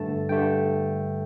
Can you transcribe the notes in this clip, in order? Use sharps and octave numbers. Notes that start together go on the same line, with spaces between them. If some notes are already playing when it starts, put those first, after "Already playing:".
Already playing: G2 D3 A3 A5
G2 D3 A3 G5